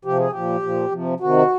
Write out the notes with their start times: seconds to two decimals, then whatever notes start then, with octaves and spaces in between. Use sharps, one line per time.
0.05 C3 F3 G4
0.18 G#4
0.31 A#2 F3 G4
0.62 A#2 F3
0.91 C3 F3
1.20 C3 D#3 F#4